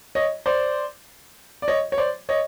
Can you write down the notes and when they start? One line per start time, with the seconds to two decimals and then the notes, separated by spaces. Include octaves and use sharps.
0.15 C#5 D#5
0.46 C5 D5
1.62 D5
1.68 C#5 D#5
1.92 C#5
1.98 C5 D5
2.29 C#5 D#5